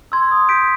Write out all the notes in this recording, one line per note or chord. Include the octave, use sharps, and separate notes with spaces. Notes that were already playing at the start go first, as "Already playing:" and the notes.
C6 E6 G#6
D#6
G6 B6 D7